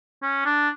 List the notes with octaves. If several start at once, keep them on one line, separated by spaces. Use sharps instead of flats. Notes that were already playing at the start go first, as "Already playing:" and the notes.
C#4
D4